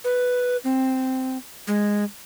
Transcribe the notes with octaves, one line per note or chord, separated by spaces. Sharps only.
B4
C4
G#3